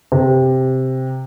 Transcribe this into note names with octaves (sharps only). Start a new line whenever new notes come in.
C3